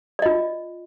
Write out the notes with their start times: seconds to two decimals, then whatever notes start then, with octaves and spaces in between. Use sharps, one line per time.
0.19 D5
0.22 D#5
0.26 F4